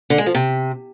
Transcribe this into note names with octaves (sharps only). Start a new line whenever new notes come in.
D3
G#3
F3
C3